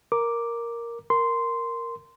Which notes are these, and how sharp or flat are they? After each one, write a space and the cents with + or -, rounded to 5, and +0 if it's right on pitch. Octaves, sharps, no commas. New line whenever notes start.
A#4 +0 D6 +0
A#4 -5 C6 -10